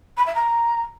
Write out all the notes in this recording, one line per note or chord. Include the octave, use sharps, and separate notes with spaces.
B5
E5
A#5